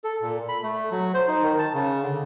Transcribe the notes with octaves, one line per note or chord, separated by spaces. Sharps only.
A4
A#2
B5
A3
F#3
C5
D#4
D#3
A5
C#3
D3